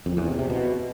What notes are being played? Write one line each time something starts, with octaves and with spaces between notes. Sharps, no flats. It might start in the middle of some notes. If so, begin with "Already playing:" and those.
F2
E2
C3
C3
B2